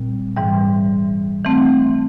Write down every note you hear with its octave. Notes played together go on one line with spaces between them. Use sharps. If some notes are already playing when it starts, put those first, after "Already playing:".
Already playing: A#2 G3 C4
G#2 E3 G3
E3 A3 C4